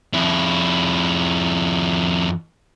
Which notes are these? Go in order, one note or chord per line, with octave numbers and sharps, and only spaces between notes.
F2 E4